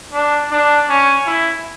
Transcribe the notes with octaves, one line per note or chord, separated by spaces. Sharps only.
D4
D4
C#4
E4